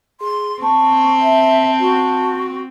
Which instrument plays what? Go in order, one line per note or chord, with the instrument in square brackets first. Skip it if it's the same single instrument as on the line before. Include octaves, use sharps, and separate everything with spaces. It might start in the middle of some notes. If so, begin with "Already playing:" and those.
[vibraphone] G#4 [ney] C6
[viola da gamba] C4 [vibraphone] A5 [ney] C#6
[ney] E5
F#4